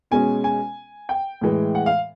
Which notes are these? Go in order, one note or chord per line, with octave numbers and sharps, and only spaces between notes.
B2 G#3 C#4 G#5
G#5
G5
A2 E3 G#3
F#5
F5